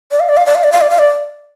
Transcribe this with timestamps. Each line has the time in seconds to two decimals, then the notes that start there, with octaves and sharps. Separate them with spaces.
0.11 D5
0.20 F5
0.29 D5
0.37 F5
0.46 D5
0.55 F5
0.64 D5
0.72 F5
0.81 D5
0.90 F5
0.99 D5